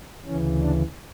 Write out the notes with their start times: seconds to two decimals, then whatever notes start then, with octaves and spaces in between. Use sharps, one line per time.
0.25 D2 C#3 E3 C#4
0.60 D4